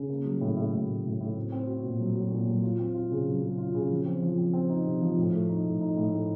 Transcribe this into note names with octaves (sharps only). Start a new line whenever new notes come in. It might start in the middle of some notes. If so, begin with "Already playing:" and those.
Already playing: C#3
A#3
F#3
A2
A2
A2
A2
A2
A2
C4
C4
F#4
A#2
F#3
F#4
A#2
F#3
F4
C4
F4
C#3
F#3
C#3
F4
C#3
F3
C4
F3
C4
C4
D#4
C3
F3
A2
A3
D#4
A2
D#4
A2
A2